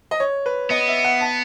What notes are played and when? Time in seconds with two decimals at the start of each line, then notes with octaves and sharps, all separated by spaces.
0.11 D#5
0.20 C#5
0.46 B4
0.70 B3 D#5
0.88 E5
1.04 F#5
1.21 A5